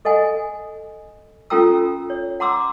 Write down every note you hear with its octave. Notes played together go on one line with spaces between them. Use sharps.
A4 D#5 F#5 G#5
C#4 F4 A4 G5 A#5 E6
C#5
F#5 A#5 C6 D6 E6